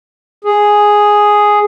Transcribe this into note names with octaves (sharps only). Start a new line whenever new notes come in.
G#4